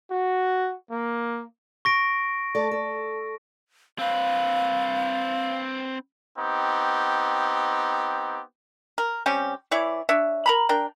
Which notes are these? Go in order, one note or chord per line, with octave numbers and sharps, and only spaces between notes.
F#4
A#3
C#6 A#6 D7
A3 A4 D5
A4
C4 B4 F5
B3 C4 D#4 G4
A#4
G3 C4 C#4 G4
E3 E4 C#5 D5
D4 C#5 E5
A#4 A#5 B5
D4 A#4 G5